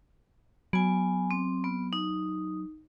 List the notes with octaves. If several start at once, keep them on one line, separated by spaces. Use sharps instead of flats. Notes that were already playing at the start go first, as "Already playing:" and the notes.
F#3 B3 G#5
C4
B3
D#4